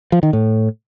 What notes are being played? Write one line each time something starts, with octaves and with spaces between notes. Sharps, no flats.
F3
D#3
A2